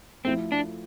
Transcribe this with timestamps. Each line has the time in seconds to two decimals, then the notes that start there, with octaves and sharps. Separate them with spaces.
0.25 F3 A3 C4 E4 A4
0.52 D4